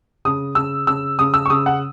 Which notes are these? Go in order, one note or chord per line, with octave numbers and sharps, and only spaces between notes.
C#3 D#6
C#3 E6
C#3 E6
C#3 D#6
E6
C#6
C#3 D#6
F#5